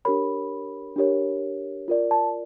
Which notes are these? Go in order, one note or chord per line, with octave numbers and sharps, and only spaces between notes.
D4 G4 A#4 C#5 B5
D4 G4 A#4 C#5
F4 A#4 D5
A5